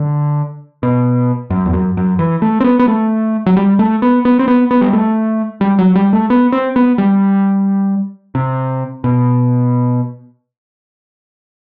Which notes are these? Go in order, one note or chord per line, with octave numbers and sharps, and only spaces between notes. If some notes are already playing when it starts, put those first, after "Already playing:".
Already playing: D3
B2
F#2
E2
F#2
F#2
E3
A3
C4
B3
B3
A3
F#3
G3
A3
B3
B3
C4
B3
B3
G3
A3
G3
F#3
G3
A3
B3
C4
B3
G3
C3
B2